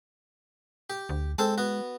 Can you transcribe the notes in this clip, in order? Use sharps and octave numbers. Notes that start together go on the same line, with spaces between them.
G4
D2
G#3 C4 A4 A5
B3 F#4